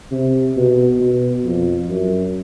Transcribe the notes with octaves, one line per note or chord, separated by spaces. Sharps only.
C3
B2
B2
F2
F#2